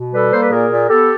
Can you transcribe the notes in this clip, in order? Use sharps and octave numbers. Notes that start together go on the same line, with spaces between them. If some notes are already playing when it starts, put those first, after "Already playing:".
Already playing: B2
G3 A4 B4
A#3 C5
B4
A#2 G#4 A#4
A#2
B3 G4 A4